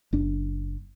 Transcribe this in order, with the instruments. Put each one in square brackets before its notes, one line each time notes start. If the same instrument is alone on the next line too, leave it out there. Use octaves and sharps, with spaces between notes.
[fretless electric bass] F#1 D4